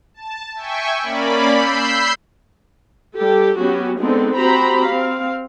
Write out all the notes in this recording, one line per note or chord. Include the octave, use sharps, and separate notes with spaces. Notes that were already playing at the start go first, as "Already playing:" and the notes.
A5
E5 G5 G#5 C#6
A#3 C#4 D5 B5
B5 E6 G6 C7
G3 G4 A4
F#3 B3 C#4 F#4 G4
G#3 B3 C4 D4 D#4 A4
C4 F#4 G4 C5 A#5 B5
C4 F5